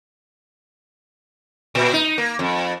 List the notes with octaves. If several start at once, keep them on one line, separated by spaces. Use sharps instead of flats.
A#2
D#4
A#3
F2